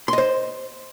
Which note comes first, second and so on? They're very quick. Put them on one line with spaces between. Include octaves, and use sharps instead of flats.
C6 D#5 C5